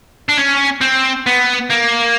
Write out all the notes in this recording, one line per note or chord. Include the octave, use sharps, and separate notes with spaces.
D4
C#4
C4
B3
A#3